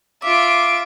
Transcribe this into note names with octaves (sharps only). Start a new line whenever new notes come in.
F4 E5 D6 D7